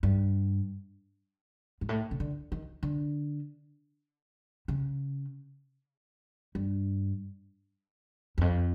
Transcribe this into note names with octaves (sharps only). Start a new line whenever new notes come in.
G2
G#2
A2
C#3
D3
D#3
D3
C#3
G2
E2
F2